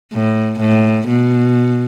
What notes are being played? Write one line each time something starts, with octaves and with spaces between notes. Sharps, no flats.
A2
A2
B2